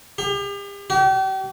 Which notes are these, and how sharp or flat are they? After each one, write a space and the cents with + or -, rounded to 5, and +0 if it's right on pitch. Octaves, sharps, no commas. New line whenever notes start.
G4 +40
G4 -40